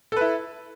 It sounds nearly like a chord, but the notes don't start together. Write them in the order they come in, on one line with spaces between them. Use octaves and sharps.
A4 B4 E4